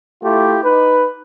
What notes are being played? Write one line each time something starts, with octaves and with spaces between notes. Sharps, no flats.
A3 E4 F4 G4
D#4 B4